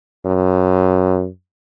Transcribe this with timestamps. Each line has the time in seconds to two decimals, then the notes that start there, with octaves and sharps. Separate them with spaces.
0.25 F#2